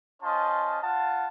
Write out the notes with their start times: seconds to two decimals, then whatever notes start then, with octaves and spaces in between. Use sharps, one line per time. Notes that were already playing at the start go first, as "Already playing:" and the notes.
0.22 C#4 F4 C5 D#5 A5 C6
0.82 F4 F#5 A5